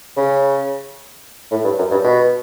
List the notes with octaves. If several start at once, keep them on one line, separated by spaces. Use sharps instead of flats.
C#3
A2
G2
F#2
G2
B2